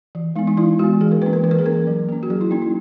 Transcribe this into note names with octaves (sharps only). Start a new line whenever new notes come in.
E3
G#3 B3 D#4
D#4
E3 E4
G#3 B3 F#4
E3 G#4
A#4
A#3 C#4 B4
A#4
E3 B4
A#4
G#4
A#3 C#4 A#4
F#3
A#3 C#4
F#4
F#3 G#4
E4
A#3 C#4 D#4
E4